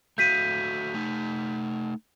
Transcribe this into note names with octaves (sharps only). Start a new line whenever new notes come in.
A3 F#4 F5 G6 B6 D#7
A3 D#4